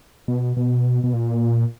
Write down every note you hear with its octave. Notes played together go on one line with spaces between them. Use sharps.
B2
B2
B2
A#2